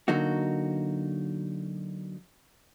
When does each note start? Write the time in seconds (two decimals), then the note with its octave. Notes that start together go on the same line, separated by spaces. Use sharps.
0.08 D3 F#3 A#3 D#4 F#4